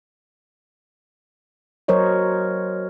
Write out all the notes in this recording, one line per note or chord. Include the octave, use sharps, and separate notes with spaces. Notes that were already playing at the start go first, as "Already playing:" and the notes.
F#3 A#4 C5 C#5 D#5